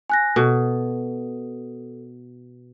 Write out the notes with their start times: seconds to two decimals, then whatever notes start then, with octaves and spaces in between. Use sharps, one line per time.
0.10 G#5 F#6 A#6
0.36 B2 A4